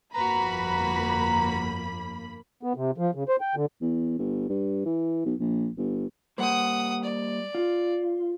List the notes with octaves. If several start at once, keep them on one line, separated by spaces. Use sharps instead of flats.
G1 F2 A#3 F#4 B4 A#5 B5
B3
C3
F3
C#3
C5
G5
D3
E2
G1
G2
E3
B1
A#1
G1
G3 A#3 C5 F#5 D#6
D5
F4